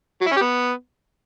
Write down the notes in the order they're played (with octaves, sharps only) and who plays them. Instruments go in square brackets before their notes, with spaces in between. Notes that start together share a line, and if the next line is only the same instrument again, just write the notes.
[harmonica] F#3
E4
C#4
G4
B3